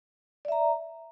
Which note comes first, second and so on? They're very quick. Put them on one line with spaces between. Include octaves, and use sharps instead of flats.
D5 E5 A#5